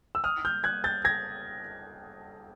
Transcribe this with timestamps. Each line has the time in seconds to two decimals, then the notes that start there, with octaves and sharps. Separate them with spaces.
0.15 E6
0.24 D#6 F6
0.45 F6 G6
0.64 F#6 G#6
0.84 G6 A6
1.05 G#6 A#6